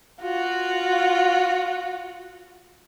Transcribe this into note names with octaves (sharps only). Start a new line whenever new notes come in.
F4 F#4